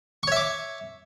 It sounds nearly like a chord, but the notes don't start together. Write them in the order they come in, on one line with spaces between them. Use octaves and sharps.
C#6 C#5 E5 D6